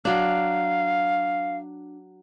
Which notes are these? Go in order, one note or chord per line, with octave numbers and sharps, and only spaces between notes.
F#3 D4 F5